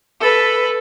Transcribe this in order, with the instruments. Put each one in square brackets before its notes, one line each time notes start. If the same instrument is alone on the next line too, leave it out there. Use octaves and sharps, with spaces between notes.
[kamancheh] A4 B4